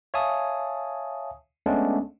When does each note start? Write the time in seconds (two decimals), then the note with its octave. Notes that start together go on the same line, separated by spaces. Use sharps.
0.14 C#5 E5 F5 G#5 A5 D#6
1.66 G#3 A3 B3 C#4 D4